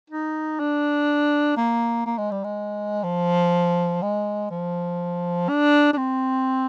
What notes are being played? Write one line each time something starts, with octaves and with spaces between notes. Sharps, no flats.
D#4
D4
A#3
A#3
G#3
G3
G#3
F3
G#3
F3
D4
D4
C4